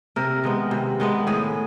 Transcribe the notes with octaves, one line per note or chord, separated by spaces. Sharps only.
C3 A#4
D#3 G#3 B3
C3
D#3 G#3 B3
A2 G#4